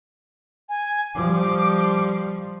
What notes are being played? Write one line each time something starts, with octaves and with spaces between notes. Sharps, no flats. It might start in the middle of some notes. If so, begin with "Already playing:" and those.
G#5
F3 G3 D6